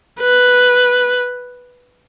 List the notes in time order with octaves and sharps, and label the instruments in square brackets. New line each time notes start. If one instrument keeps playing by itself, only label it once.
[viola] B4